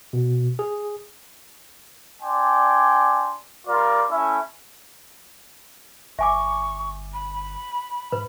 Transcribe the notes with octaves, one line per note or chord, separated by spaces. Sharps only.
B2
G#4
D4 D5 G5 G#5 C6
G3 F4 A#4 D5
A3 C#4 E4 E5
G1 E5 G#5 C#6 D6
B5
G#2 B4